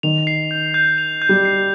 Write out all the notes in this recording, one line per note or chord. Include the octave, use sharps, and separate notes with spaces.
D#3 F7
C7
G6
G6
F7
G6
G3
C7